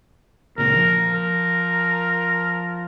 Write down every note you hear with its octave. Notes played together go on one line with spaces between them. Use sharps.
C#2 A#2 C#3 A#4
F3
A#4